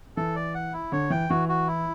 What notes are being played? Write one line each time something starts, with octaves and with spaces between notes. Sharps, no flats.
E3 A4
D5
F#5
E4
D3 C#5
E3 G5
E3 F#4
F#4
E4